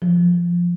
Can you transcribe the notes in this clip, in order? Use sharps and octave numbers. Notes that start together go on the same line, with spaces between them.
F3